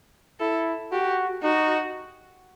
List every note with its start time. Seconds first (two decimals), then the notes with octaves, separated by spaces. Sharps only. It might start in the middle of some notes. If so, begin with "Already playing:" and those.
0.40 E4 A4
0.92 F#4 G4
1.43 D#4 F#4